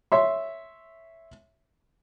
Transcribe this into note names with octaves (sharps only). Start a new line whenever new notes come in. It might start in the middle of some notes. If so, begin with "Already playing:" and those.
C#5 E5 C6